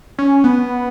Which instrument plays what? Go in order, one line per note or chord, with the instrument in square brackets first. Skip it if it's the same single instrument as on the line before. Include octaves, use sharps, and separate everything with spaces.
[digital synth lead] C#4
B3